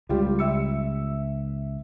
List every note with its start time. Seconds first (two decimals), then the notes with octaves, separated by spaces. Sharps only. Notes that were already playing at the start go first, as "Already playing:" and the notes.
0.09 C#2 G3 F4 G4
0.39 E5 E6 C#7